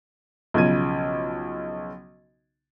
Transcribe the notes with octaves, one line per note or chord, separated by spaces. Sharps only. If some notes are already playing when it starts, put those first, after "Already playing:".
B1 C#3 F3 G#6 D#7